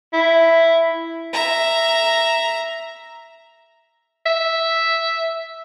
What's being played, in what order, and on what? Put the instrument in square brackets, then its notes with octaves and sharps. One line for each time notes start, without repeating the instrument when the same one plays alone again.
[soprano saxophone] E4
[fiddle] E5 A#5
[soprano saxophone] E5